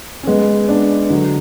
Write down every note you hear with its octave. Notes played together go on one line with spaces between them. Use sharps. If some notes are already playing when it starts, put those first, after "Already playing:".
C#4
G#3 B3
B3 D4
D3 F#3